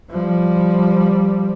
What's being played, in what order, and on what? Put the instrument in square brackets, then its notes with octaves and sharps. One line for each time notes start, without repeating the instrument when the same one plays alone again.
[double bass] F3 G3